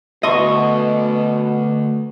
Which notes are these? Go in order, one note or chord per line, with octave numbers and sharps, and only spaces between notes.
D2 B2 D#5 C#6